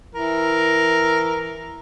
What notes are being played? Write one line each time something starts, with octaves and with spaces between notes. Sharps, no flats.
E3 A#4